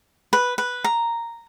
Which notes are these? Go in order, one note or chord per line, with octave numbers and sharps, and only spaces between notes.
B4
B4
A#5